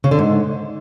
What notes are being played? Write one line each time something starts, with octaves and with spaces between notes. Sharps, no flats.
C#3
D3
G#2